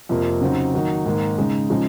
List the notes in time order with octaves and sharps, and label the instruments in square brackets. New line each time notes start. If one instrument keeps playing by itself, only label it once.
[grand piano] F2 C3 F3 A#3
C#3 F#3 C4 D#4
D#3 F#3 A#3 D#4
G#2 D#3 A#3
C#3 G#3 D#4
C#3 F3 G#3 D#4